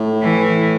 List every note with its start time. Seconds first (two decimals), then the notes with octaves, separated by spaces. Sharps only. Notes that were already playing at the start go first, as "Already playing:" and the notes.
Already playing: A2
0.22 E3